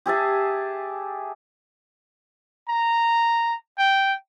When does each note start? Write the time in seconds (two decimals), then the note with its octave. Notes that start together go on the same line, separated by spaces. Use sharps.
0.06 G4 G#4 E5 A5
2.69 A#5
3.78 G5